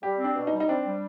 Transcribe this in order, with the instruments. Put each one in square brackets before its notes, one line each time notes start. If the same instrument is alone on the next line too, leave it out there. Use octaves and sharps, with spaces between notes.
[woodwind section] G3 [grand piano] G4
[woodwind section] C4
[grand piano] D4
[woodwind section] B2
[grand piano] D#4
[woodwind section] G3
[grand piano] D#4
[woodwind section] C4 [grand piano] D4
[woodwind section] G3